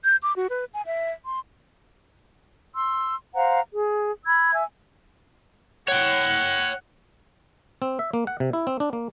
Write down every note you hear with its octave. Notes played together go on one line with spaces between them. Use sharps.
G6
D6
F#4
B4
G#5
E5
C6
C6 E6
C5 F5 F#5 A#5
G#4
B5 E6 G#6
E5 G#5 E6
C#5 F#5 G5
C4
E5
A#3
F#5
C3
E4
C4
D4
A#3